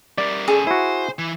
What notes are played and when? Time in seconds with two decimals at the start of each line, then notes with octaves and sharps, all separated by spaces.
0.18 G3 A#4 D5
0.48 C#4 G#4 A4
0.67 E4 F#4 C5
1.19 E3